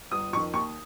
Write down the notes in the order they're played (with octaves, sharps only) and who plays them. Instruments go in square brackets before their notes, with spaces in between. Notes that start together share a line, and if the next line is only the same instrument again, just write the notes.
[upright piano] G1 D#6
F2 C#6
D#3
D#2 C#6